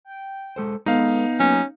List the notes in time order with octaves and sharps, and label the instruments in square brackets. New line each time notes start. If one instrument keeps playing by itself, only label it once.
[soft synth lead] G5
[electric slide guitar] G#3 A4 C5
[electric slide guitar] G#3 A4 B4 [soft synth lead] B3 [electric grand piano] D#4 F5
[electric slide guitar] F#3 A#3 [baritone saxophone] C#4